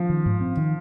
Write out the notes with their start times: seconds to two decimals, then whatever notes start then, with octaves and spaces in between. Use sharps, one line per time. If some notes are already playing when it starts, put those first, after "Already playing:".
Already playing: F3
0.10 D#3
0.26 G#2
0.41 C4
0.57 D#3